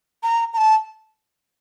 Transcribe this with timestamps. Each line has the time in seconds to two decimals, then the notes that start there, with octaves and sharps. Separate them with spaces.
0.23 A#5
0.54 A#5
0.57 A5